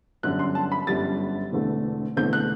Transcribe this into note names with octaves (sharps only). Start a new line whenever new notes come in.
G1 F#2 D3 G3 F#6
C6
A5
B5
G1 F#2 D3 G3 A6
E1 E2 D3 A3 C4
E1 E2 D3 A3 C4 G6
F#6